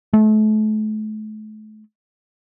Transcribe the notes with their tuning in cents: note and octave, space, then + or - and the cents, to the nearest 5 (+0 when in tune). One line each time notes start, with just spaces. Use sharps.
A3 -35